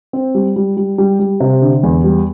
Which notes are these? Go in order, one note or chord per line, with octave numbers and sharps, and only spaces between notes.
C4
G3
G3
G3
G3
G3
C3
D3
E2
G3